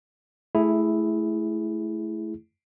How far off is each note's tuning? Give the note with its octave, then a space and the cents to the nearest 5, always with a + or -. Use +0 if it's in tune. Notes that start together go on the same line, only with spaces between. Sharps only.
A3 -15 E4 +0 G#4 +0